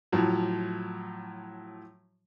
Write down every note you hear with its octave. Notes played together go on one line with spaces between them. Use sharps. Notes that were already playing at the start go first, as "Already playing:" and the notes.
A2 F3 F#3